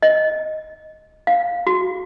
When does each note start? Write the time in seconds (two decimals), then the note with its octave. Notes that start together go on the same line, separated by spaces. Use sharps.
0.02 D#5
1.27 F5
1.67 F#4